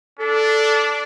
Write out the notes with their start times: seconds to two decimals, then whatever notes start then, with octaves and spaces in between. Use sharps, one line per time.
0.19 D4 A4